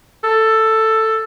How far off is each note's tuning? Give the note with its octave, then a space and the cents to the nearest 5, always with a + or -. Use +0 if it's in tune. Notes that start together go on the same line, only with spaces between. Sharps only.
A4 +10